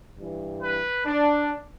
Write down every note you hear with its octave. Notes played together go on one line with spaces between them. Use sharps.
G2 E3
B4
D4